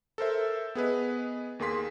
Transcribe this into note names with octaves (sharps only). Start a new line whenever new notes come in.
A4 A#4 C5 E5
B3 G#4 B4 D#5
D#2 A#3 G#4 C6 B6